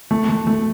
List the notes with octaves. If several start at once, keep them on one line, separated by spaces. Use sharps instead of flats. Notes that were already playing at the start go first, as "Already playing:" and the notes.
A3
A3
A3